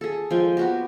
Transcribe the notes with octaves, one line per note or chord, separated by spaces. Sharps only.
G#4 A4
F3 G#3 G5 G#5
B3 F#4 G4